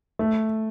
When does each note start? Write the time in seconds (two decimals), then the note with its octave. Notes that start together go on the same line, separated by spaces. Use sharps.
0.19 A3